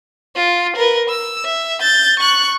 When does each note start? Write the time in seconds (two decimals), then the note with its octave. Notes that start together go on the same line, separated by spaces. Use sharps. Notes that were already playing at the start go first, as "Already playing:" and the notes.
0.36 F4
0.76 A#4 B4
1.09 E6
1.45 E5
1.81 G6 A6
2.19 C#6 F#6